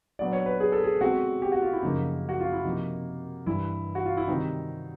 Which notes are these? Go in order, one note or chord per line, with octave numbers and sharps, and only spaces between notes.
A#2 F#3 B3 D4 D5
C#5
B4
G#4
A4
G#4
B2 G#3 C4 F#4
G4
F#4
F4
E4
F#2 C#3 F3 A#3 D#4
F#4
F4
E4
C3 F3 A#3 D#4
G2 E3 G3 E4
F#4
F4
E4
C3 D#3 G3 C4 D#4